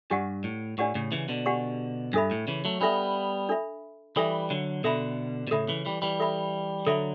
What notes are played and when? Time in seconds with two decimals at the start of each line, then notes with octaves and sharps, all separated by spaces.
0.10 G2 D4 G4 D5 F#5 C#6
0.44 A2
0.78 A2 D4 G4 D5 F#5 C#6
0.95 A2 C#3
1.12 C#3 E3
1.29 B2 D3
1.46 D4 G4 D5 F#5 C#6
2.13 G2 D4 A4 E5 B5
2.31 A2
2.48 C#3 E3
2.65 F#3 A3
2.81 G3 B3 D4 A4 E5 B5
3.49 D4 A4 E5 B5
4.16 E3 G3 D4 A4 E5 B5
4.50 D3 F#3
4.84 B2 D3 A4 E5 B5
5.47 B2
5.51 A2 C#3 A4 E5 B5
5.68 C#3 E3
5.86 E3 G3
6.02 E3 G3
6.20 A4 E5 B5
6.86 D3 F#3 A4 E5 B5